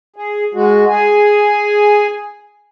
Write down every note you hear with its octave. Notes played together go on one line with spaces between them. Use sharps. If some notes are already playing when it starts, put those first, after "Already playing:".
G#4
G#3 F#4
G#4 G#5